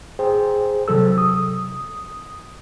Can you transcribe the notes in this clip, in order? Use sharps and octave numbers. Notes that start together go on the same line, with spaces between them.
G#4 C5 G5
C3 F#3 A4 E6
D#6